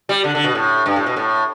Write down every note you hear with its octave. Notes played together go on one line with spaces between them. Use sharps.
G3
D3
D3
B2
A2
G2
A2
B2
A2